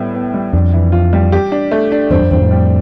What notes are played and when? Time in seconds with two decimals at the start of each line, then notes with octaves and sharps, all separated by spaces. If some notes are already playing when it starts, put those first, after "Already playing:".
Already playing: A2 G3 B3
0.14 B3
0.34 G3
0.53 F2 D4
0.73 E3
0.92 F4
1.13 G3
1.32 G4
1.52 D4
1.71 A3
1.92 D4
2.11 E2 G2 C4
2.21 F2
2.31 E2 G2 C4
2.41 F2 A2
2.51 G3